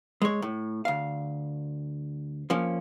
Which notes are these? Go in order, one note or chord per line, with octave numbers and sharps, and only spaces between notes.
G#3 C#5
A2
D2 F5
F3 A#3 C#4